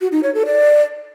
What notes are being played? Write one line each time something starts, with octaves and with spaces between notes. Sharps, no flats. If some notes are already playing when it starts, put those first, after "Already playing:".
F#4
D#4
C#5
A4
D5